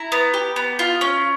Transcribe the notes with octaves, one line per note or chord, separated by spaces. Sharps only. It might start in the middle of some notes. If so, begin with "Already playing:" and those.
Already playing: E4 A#5
B3
G4
B3
F4
C#4